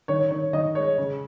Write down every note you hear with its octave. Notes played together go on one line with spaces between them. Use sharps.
D#3 C#5
D#3 C#5
D#3 D#5
G#3 C#5
C#3